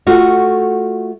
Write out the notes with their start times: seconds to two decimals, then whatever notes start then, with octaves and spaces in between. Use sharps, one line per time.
0.07 A3 F4 F#4